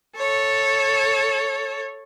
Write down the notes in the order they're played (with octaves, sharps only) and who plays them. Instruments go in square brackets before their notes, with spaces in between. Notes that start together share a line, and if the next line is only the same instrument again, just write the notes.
[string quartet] A4 C#5